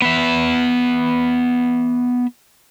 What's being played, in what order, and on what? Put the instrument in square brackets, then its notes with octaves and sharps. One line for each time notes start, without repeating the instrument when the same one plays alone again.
[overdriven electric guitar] B3 E5